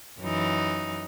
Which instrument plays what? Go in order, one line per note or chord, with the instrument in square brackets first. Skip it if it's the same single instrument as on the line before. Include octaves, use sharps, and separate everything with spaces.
[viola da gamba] F#2 E3 D#4